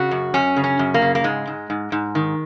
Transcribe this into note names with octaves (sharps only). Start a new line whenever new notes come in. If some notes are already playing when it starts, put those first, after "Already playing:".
Already playing: C#3 F#4
F#2
F#2 C#4
C#3
C#4
F#2
A#3
C#3
A#3
G#2 G#3
G#2
G#2
G#2
D#3